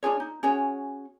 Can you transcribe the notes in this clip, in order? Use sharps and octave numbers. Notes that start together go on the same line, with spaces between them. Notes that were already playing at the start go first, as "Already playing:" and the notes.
D4 F4 G#4 C#5
D#4
C#4 F#4 G#4 C#5